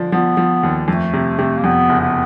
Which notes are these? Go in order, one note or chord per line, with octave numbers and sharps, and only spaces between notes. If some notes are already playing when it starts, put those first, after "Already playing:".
Already playing: D3 F3
F3 B3
F3
D#2
F2 A3
C3
C3
A#3
F2 B3
F#1
B3